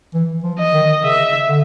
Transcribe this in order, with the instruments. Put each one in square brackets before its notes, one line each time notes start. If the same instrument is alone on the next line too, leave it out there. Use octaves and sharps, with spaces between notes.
[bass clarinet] E3
F3
[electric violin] D#5
[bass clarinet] D#3
[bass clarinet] C#3 [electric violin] E5
[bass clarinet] D3